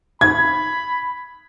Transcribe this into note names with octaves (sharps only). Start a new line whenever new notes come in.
B5 G#6